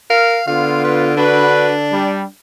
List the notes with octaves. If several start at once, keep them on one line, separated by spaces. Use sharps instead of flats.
A#4 F5
D3 B3 F4 F5
B4
D4 F#4 B4
G3